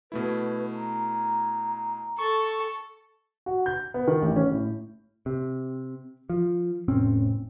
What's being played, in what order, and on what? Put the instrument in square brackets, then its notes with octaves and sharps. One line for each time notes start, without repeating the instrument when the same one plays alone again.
[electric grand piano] B2 A3 E4 [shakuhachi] B4
[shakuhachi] A#5
[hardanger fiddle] A4 A5 [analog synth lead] C#6
[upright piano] F#4
G6
B3
D#3
A1
C#4
A2
[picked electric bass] C3
F3
F1 A2 C4 C#4